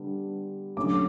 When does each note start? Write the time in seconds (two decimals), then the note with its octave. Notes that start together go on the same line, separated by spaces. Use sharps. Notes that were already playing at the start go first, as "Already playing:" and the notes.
Already playing: D3 G3 B3 D4
0.77 D3 F#3 A3 C#4 D6